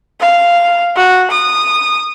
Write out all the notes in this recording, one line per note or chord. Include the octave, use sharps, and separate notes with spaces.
F5
F#4
D#6